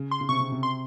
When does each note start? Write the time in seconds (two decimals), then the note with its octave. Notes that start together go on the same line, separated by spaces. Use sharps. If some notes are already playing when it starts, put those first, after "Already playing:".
Already playing: C#3
0.11 C6
0.21 C#3
0.29 C3 C#6
0.40 C3
0.52 C3
0.63 C6